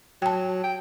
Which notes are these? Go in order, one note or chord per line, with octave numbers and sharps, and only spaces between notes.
F#3 G5 A5
G5